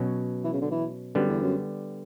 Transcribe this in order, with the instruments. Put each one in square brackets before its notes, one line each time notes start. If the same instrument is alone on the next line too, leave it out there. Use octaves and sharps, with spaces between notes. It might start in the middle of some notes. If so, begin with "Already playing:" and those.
Already playing: [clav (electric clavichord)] B2 F#3 C#4
[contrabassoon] E3
C#3
D3
E3
[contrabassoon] F#2 [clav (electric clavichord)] D3 G3 B3
[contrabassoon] E2
F#2